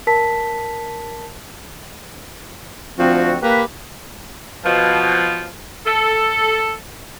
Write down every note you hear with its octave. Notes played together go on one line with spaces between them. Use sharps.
A#4 A5 B6
D2 F3 C4 F#4
A#3 G4 B4
B2 F3
A4